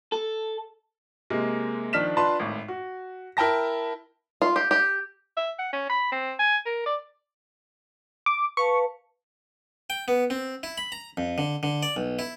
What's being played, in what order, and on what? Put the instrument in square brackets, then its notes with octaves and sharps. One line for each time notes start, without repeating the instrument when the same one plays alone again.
[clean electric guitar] A4
[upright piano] C3 G#3 A#3
D#3 F3 D4 F6 B6 E7
D4 F4 B4 A5 C6
G#1 A2
F#4
E4 A#4 G5 A5 A#6
[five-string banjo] F4
G4
G4
[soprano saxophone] E5
F#5
C#4
B5
C4
G#5
A#4
D5
[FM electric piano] D6
[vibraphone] B4 F5 A5 [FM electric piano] C#6
[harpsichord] G5
B3
C4
E4
B5
A#5
F2
D3
D3
D5
B1
E4